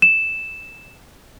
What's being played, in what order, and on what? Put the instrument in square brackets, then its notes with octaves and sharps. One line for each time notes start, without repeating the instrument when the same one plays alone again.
[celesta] E7